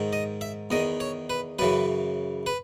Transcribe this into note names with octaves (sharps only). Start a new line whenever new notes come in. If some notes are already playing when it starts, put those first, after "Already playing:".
Already playing: G#2 D#3
D#5
E5
E2 D#3 D#5
C#5
B4
F#2 C#3 E3 B4
B4